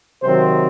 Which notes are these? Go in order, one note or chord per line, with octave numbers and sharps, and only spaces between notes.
C3 D#3 F#3 C4 C5